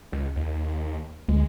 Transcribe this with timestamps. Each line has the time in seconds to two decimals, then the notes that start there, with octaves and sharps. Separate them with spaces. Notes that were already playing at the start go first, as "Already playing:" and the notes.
0.12 C#2
0.36 D#2
1.29 D2 G#3